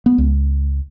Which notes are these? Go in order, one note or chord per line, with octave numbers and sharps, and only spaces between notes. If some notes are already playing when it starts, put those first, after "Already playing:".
B3
C#2